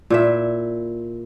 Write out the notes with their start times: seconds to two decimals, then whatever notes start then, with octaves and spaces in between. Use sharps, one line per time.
0.10 A#2 E4 E5